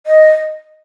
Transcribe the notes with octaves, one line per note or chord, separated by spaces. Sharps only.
D#5